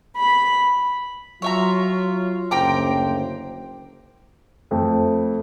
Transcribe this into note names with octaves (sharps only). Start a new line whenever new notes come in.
B5
F#3 F4 C#5 E5 A#5
F#1 D2 C5 G5 A#5 D6
F2 A3